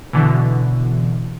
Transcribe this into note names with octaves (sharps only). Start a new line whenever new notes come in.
B2 D3 E3